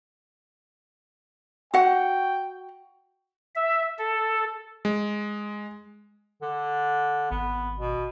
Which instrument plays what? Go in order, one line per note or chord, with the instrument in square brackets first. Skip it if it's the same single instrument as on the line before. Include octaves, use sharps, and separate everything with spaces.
[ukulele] F#4 F#5 [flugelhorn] G5
[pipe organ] E5
A4
[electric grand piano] G#3
[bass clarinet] D3
[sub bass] G#1 [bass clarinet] B3
[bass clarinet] B2